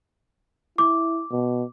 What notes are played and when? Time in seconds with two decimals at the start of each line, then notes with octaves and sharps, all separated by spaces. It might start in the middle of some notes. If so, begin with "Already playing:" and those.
0.78 E4 D6
1.31 B2